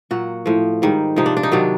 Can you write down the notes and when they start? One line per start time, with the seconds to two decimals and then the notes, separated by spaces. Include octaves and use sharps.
0.11 A#2 F#3 F#4
0.46 A2 F3
0.82 G#2 D#3 G3
1.16 C3 F3 D#4
1.26 D4
1.37 D4
1.43 D#4
1.52 C3 D#3 F#3 D4